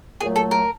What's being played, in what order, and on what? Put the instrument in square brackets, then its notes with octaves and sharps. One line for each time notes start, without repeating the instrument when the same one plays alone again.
[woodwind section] A#2 F#3 A3 [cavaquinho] G#4
[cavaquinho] A4
A#4